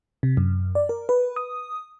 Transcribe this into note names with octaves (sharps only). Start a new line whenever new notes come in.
C3
F#2
D5
A#4
B4
D#6